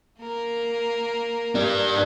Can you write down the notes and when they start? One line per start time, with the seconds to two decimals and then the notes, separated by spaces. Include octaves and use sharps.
0.20 A#3 A#4
1.55 G3 D4